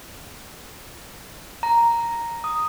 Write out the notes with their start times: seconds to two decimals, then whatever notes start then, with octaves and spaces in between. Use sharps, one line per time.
1.63 A#5
2.44 D#6